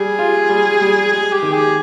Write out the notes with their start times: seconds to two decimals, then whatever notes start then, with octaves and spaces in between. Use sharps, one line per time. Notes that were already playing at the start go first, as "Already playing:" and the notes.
Already playing: G3 G#4
0.19 F4
0.50 G3
0.81 G3
1.12 G#3 G#4
1.33 G4
1.43 D#3
1.53 G#4